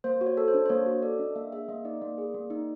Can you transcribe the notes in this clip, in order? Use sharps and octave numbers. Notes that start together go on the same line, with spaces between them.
A#3 C5
F#4
C#5
A4
C5
D4
C5
A#3 C#5
F#4
A4 D5
D4 D#5
A#3 E5
G#4 E5
A#3 D#5
D#4 D5
A#3 D5
G#4
A#3
D#4